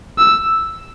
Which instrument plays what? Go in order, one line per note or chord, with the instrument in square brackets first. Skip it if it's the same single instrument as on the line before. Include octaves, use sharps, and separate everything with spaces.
[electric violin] E6